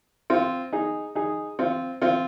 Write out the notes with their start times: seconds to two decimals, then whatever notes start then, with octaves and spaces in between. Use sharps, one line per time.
0.30 C4 F4
0.73 D#4 G#4
1.15 D#4 G#4
1.59 C4 F4
2.02 C4 F4